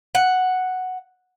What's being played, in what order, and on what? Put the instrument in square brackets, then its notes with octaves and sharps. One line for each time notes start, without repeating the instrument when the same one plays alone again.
[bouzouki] F#5